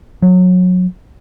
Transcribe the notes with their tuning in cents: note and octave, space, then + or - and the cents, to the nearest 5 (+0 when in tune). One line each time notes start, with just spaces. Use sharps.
F#3 -25